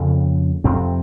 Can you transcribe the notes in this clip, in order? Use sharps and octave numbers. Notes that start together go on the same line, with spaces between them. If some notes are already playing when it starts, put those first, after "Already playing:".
Already playing: F2 C#3 A#3
F2 C3 C4